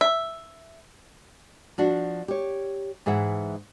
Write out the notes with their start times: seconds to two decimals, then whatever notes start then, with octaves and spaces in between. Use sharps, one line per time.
0.01 E5
1.78 F3 D4 F#4
2.28 G4 C#5
3.06 G#2 E3 G#4 E5 F#5